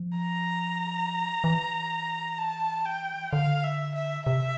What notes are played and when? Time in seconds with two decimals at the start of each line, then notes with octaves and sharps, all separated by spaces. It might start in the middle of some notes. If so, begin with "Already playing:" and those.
Already playing: F3
0.18 A#5
1.44 E3
2.38 A5
2.85 G5
3.33 D3 F5
3.64 E5
3.95 E5
4.27 C3 E5